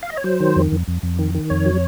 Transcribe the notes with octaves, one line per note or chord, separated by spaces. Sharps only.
F5
D#5
C#5
F#3 C5
D#3
F2
F2
F2
F2
D#3
D#3
F2 C#5
F#3